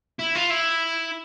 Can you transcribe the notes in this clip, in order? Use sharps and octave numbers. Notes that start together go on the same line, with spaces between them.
E4
F4
E4